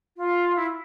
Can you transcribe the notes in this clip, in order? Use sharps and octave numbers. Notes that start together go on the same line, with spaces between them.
F4
E4